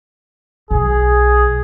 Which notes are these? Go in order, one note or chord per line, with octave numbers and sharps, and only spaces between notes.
B1 G#4